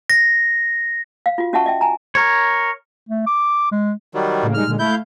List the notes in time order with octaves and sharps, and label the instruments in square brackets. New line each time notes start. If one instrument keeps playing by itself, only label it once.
[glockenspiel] A#6
[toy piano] F5
F4 F#4
C#4 F#4 E5 F#5 A5 C#6
D#5 E5 G5
G#5 A#5
[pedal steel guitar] A#4 C#5
[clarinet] A3
D6
G#3
[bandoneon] D#3 F#3 G3
[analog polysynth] A2 C#3 A#3
[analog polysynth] G3 G#3 D#4 [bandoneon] F6
[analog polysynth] A#2 D3 G#3
[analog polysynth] A3 F5 [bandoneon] E4 G6